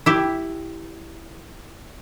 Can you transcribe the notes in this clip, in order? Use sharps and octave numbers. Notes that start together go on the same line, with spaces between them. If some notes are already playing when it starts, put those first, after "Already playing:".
E4 G4